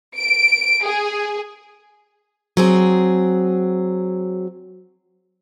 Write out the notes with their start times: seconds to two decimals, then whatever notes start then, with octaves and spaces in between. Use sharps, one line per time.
0.17 D7
0.83 G#4
2.57 F#3 C4 G#4